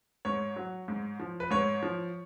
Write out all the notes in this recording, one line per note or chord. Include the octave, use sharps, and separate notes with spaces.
G#2 C#5
F#3
G#2
F3
B4
G#2 C#5
F3